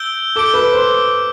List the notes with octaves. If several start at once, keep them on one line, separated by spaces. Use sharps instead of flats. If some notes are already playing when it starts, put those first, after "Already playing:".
Already playing: E6 G6 D7 G7
A4 D6 G6 D7 G7
B4
C5